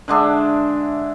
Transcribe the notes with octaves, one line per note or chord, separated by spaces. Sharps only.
D3 G#3 D4 E5